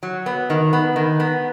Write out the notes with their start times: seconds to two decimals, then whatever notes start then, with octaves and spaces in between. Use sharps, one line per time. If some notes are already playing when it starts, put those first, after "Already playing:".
0.03 F#3
0.26 B3
0.50 D#3
0.73 B3
0.96 D#3
1.20 B3